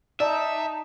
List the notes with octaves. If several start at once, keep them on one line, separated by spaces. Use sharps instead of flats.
D#4 D5 E5 A5